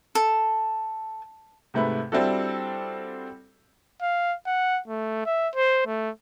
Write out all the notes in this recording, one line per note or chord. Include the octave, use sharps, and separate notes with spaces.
A4
G#2 C3 A3 B4 B5
G3 C4 D4 E4 F#4 A4
F5
F#5
A3
E5
C5
A3